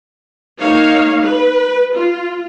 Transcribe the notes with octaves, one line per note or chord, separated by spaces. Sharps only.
A#3 D#4 C#5 F5
B4
F4